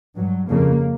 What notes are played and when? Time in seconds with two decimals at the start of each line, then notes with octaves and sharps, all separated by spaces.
0.16 G2 F#3
0.50 F2 C#3 A#3